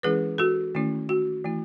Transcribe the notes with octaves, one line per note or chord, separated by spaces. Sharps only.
E3 G#3 C#4 E4 G#4 B4
F#4 A4
D#3 A3 C#4 E4
F#4
E3 A3 E4